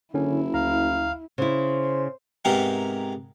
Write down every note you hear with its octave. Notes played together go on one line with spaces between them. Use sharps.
F#1 D3 C#4 E4
D2 F5 A#5
C#3 E4 C5
G#2 C3 B3 G4 A#4